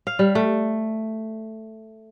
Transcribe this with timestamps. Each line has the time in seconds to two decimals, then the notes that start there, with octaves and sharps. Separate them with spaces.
0.07 F5
0.19 G3
0.35 A3